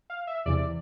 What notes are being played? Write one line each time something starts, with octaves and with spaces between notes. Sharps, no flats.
F5
E5
E2 C3 E3 D5